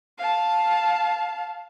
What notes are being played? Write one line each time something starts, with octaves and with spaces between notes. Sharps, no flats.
F5 A5